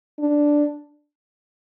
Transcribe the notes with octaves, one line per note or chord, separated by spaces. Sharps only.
D4